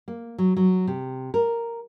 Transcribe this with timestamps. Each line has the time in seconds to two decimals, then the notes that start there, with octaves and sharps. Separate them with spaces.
0.08 A#3
0.38 F#3
0.57 F#3
0.87 C3
1.34 A#4